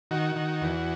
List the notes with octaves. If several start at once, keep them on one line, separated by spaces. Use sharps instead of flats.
D#3 F#4
D#3
E2